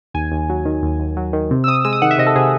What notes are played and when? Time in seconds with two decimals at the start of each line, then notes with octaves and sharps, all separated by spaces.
0.14 D#2 G#5
0.32 D#2
0.50 F#3
0.65 D#3
0.83 D#2
0.99 D#2
1.17 F#3
1.33 D#3
1.51 C3
1.64 E6
1.68 C3 D#6
1.85 G#3 E6
1.93 D#6
2.02 D#3 F#5
2.11 E5
2.18 C3 D#5
2.27 A4
2.35 C3 G#4